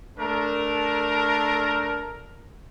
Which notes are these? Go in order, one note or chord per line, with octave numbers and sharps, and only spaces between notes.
A3 D4 A#4